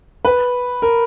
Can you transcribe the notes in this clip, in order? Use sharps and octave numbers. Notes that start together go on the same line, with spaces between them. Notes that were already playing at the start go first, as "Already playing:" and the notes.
B4
A#4